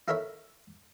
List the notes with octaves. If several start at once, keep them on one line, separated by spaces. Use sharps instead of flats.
D#4 E4 A4 A#4 C#5 E5